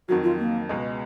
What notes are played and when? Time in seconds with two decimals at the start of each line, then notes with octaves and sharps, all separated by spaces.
0.08 F2 D#3 F#3 F#4
0.24 F4
0.39 A#3
0.69 C#2 B2 G#3